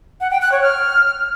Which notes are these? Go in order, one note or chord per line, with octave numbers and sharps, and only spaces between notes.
F#5
G5
F#6
C#5
F6